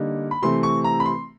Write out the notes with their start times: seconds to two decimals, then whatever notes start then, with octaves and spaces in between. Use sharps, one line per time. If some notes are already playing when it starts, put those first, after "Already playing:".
Already playing: D3 G3 A#3 D#4
0.31 B5
0.42 C3 E3 A3 C4 C6
0.63 C#6
0.84 A#5
1.00 B5
1.05 C6